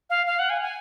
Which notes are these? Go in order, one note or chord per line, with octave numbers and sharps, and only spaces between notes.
F5
F5
F#5
G#5
G#5